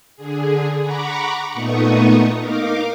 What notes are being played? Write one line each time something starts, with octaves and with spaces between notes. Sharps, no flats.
D3 G#4
F#5 A#5 B5 C#6 D6
A#2 A3 B3 D#4 C#6 D#6
D#4 A#4 F5 D6